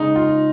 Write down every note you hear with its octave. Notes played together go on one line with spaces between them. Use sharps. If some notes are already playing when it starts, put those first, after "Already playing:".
Already playing: C#3 G#3 D#4
F4